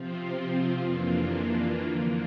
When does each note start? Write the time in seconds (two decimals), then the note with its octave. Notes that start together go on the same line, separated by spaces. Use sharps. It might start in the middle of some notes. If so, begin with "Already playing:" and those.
Already playing: C3 F3 C4 F4
0.81 F2 E3 A#3 D4 F4
1.81 D3 F3 A#3